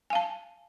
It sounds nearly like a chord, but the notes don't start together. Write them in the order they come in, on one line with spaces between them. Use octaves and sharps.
G#5 F5 A5